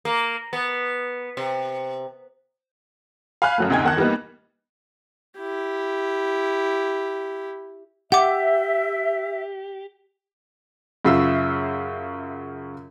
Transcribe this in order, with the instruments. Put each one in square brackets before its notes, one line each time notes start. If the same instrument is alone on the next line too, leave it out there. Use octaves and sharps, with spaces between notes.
[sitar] A#3
B3
C3
[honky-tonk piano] F5 G#5 B5 F6 F#6
F#2 F#3 A3
D2 C3 D#4 G5 G#5 G#6
E2 D#3 F#5 A5 F#6
E3 G3 A#3 B3 D#4
[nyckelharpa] E4 G4
[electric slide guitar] G4 [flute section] E5 [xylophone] F#5 D6
[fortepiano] F#2 C#3 F4 E5 E6